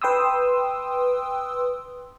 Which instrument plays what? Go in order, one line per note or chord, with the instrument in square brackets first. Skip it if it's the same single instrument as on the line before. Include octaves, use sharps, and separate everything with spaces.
[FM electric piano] B4 G5 C6 D#6 E6